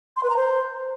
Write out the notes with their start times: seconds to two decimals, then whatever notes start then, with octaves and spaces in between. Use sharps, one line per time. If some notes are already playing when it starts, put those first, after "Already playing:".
0.17 C6
0.23 B4
0.30 A#5
0.37 C5